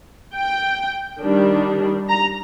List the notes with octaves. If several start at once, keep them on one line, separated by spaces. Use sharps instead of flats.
G5
D#3 G3 D4
A#5